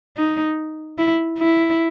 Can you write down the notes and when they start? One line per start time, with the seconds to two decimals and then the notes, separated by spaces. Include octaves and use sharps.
0.17 D#4
0.98 E4
1.39 E4